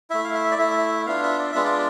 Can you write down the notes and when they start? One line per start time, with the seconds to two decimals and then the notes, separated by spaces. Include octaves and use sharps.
0.10 A3 E4 E5
0.24 F5
0.34 E5
0.51 D5
0.58 A3 E4 E5
1.06 B3 D4 F4 F5
1.23 E5
1.39 D5
1.52 G#3 B3 D4 F4 E5
1.65 D5